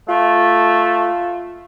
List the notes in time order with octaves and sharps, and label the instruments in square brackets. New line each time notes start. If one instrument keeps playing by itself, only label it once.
[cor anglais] A3 [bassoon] F4